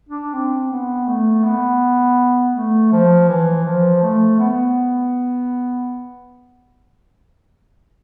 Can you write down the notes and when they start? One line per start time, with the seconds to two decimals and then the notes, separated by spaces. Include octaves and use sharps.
0.09 D4
0.33 C4
0.71 B3
1.08 A3
1.44 B3
2.55 A3
2.92 F3
3.29 E3
3.65 F3
4.02 A3
4.39 B3